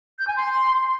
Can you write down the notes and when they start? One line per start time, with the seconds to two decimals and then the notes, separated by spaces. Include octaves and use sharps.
0.20 G6
0.28 G#5
0.37 C6